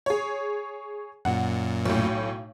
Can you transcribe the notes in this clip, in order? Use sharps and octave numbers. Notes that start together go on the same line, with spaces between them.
G#4 C#5
F#2 A#2 F#5
B1 A2